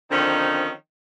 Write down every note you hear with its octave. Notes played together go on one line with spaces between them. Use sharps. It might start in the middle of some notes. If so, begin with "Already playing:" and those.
D3 D#3 F3 C4 C#4 D#4